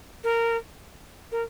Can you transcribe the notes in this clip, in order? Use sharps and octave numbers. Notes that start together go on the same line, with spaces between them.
A#4
A#4